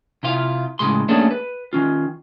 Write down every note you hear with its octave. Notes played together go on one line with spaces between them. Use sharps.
C3 E4 F4 F5
A2 C#3 E3 G#3 C6
A3 A#3 C#4 D4 G#4 A4
B4
D#3 C#4 F4